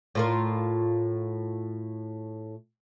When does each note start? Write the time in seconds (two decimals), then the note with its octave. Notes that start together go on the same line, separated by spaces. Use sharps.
0.15 A2 F4 A#4